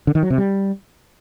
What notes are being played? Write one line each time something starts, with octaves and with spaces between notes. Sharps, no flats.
D3
D#3
F#3
C3
G3